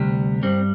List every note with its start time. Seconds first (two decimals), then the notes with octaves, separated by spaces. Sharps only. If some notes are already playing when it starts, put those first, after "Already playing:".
Already playing: D2 C3 G3
0.43 G2 G3 C4